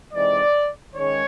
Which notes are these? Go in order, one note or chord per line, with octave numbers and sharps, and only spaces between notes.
C3 E3 G#3 C4 D#4 D5
D#3 G#3 C#4 C#5